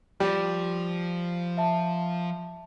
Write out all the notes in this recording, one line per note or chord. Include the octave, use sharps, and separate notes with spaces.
F3 G3
E5 A5